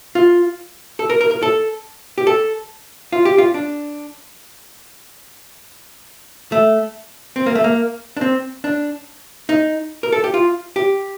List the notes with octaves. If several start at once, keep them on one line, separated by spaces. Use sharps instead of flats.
F4
A4
A#4
A#4
A#4
A4
G4
A4
F4
G4
F4
D4
A3
C4
A#3
A3
A#3
D4
C4
D4
D#4
A#4
A4
G4
F4
G4